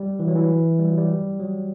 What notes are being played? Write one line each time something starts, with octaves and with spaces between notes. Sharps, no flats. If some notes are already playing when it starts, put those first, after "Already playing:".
Already playing: G3
E3
F#3
E3
G3
F#3
G3
F#3